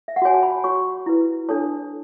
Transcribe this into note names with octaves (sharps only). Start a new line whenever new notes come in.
E5
F#5
F#4 C#5 G#5
A5
B5
F#4 C#5 C#6
E4 B4
D4 A4 C#5 A5